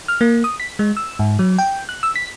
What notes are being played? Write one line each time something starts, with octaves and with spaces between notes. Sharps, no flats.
F6
A#3
D#6
B6
G#3
E6
G#2
F#3
G5
F#6
E6
B6